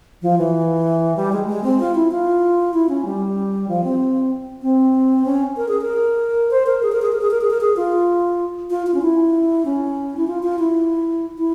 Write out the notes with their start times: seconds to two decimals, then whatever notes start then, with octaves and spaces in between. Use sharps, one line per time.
0.22 F3
0.38 E3
1.16 G3
1.32 G#3
1.48 G#3
1.64 C4
1.80 F4
1.95 E4
2.11 F4
2.74 E4
2.89 C#4
3.05 G3
3.68 F3
3.84 C4
4.62 C4
5.26 C#4
5.57 A#4
5.68 G#4
5.81 A#4
6.51 C5
6.66 A#4
6.83 G#4
6.92 A#4
7.02 G#4
7.12 A#4
7.21 G#4
7.31 A#4
7.41 G#4
7.51 A#4
7.61 G#4
7.76 F4
8.70 F4
8.87 F4
8.94 C#4
9.02 E4
9.65 C#4
10.17 E4
10.27 F4
10.43 F4
10.59 E4
11.38 E4